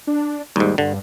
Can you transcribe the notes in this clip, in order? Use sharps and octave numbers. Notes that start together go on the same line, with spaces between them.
D4
D#2 G#2 G3
G2 D3